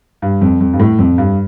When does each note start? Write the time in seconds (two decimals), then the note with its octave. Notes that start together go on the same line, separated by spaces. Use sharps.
0.22 G2
0.41 F2
0.61 F2
0.73 G2
0.80 A2
0.99 F2
1.18 G2